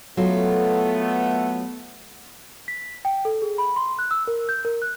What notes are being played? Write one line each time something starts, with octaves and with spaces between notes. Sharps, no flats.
F#3 A3 B3 F4 A4
B6
G5
A4
G#4
B5
C6
F#6
E6
A#4
G6
A#4
F#6